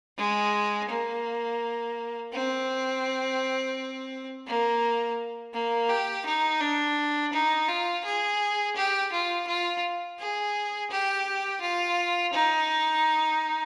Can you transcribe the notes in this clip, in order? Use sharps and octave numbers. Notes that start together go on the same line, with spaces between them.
G#3
A#3
C4
A#3
A#3
G4
D#4
D4
D#4
F4
G#4
G4
F4
F4
G#4
G4
F4
D#4